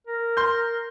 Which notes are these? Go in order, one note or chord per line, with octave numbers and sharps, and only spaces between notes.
A#4
C6 G6